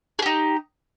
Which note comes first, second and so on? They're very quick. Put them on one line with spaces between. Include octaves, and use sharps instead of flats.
G#4 G4 D#4